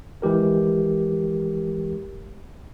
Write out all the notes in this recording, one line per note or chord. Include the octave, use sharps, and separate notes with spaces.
E3 G#3 G4 A#4